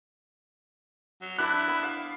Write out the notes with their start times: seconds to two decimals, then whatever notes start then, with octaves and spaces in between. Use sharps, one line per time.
1.21 F#3
1.39 D4 E4 B4 F#6
1.68 B3
1.83 F5